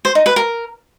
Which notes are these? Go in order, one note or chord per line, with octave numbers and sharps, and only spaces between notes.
C5
D#4
B4
A#4